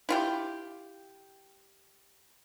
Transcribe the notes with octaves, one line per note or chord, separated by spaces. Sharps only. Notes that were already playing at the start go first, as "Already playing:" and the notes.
E4 F4 G4